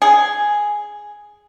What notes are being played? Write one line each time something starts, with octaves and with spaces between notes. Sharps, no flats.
G#4